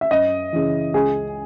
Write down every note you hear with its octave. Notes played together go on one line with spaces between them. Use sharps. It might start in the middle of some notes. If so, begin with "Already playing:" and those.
E5
F#2 D#5
C#3 E3
C#2 G#4